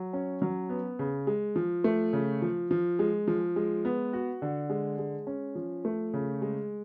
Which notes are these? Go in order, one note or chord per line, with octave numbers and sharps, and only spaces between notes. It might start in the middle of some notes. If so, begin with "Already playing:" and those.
Already playing: F#3
C#4
F#3
B3
C#3
G#3
F3
A3
C#3
F3
F3
G#3
F3
G#3
B3
F#4
D3
G#3
G#3
C#4
F3
A3
C#3
G#3